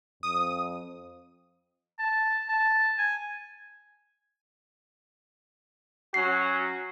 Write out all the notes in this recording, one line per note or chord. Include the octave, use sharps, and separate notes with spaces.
F2 D#6
A5
A5
G#5
F#3 C#4 F#4 C7